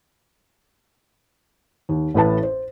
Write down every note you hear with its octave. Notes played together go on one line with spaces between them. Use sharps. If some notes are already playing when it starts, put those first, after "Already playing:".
D#2
A1 A2 B4 A5
C5